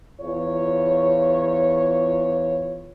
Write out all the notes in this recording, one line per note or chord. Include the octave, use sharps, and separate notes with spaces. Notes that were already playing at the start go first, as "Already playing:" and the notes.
E2 F4 C#5